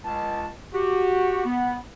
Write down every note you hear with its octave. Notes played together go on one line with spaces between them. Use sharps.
C#2 A5
F#4 G4
B3